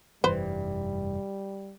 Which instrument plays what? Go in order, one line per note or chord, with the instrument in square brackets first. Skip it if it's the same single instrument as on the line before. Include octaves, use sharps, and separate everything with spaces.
[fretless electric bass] F1 G2 E3 [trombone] G3 [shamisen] B4 C5